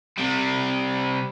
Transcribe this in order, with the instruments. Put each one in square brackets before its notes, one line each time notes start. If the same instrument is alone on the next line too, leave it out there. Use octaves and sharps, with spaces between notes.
[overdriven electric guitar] C3 G3